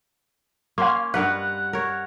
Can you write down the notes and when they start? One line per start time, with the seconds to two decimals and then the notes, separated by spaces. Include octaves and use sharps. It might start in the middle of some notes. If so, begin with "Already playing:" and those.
0.78 A#3 C#4 F5 C6
1.14 G2 A#4 B4 F#5
1.73 A#4 C#5